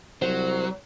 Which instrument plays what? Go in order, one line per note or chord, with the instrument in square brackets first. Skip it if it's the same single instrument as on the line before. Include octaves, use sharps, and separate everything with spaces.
[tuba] C2 [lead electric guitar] F#3 [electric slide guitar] C5